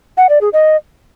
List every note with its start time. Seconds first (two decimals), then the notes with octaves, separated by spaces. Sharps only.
0.17 F#5
0.29 D5
0.41 G#4
0.53 D#5